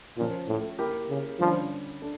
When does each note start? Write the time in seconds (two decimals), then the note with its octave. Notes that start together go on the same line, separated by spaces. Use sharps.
0.17 A#2 F3 C#4 F4
0.48 A2
0.79 A#3 E4 G4 A#4
1.09 C#3
1.40 D3 F3 G3 C#4
2.02 A3 D4